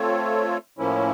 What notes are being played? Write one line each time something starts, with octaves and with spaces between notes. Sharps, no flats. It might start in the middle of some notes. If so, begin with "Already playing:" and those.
Already playing: A3 C4 F4 A4 C#5
A2 F3 A#3 C#4 E4